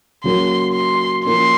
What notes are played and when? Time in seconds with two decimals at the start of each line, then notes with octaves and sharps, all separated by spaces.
0.24 C#3 F#3 A#3 C6
0.74 C6
1.25 F3 A#3 C#4 C6